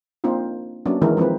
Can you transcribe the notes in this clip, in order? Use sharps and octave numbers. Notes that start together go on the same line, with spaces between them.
A#3 C4 D4 D#4 F4
F#3 A#3 B3 C#4 D4
D#3 E3 G#3 B3 E4 A#4
F3 G#3 C4 D#4 B4